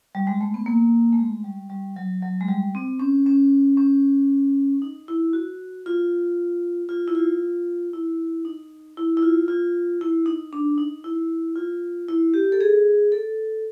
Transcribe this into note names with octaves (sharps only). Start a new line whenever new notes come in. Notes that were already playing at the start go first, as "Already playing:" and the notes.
G3
G#3
A3
B3
A#3
A3
G#3
G3
G3
F#3
F#3
G#3
G3
C4
C#4
C#4
C#4
D#4
E4
F#4
F4
F4
E4
F4
E4
D#4
E4
E4
F4
F4
E4
D#4
D4
D#4
E4
F4
E4
G4
A4
G#4
A4